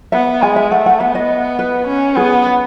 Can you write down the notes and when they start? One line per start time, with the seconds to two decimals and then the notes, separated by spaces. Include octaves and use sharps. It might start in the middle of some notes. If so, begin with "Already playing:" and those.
0.12 B3 E5
0.42 G#3 G#5
0.56 E5
0.71 A3 F#5
0.86 F#5
1.00 B3 E5
1.15 D#5
1.59 B4
1.87 C#4
2.16 B3 G#4
2.46 B4